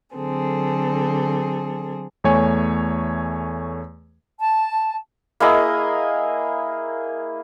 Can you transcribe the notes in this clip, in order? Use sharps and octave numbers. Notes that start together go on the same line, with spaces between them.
D3 F#3 C4 G#4 A4
E2 A3 C#5 G#5
A5
A#3 E4 G#4 D#5